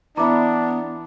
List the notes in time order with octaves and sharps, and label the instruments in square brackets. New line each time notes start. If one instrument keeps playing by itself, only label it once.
[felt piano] E3 E5 B5 [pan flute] B3 [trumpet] D4 [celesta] A#5 D6